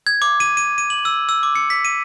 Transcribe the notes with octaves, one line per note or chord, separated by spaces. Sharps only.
G#6
D6
D#7
D#7
D#7
F#7
E6
E6
D6
C#7
B6
D#7